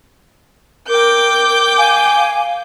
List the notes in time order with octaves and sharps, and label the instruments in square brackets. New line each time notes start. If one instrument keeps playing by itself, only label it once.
[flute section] A#4 [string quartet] G5 D6 G6
[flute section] F5 G#5